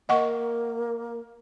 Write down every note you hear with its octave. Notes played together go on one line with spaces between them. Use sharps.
A#3 D#5 F#5 C#6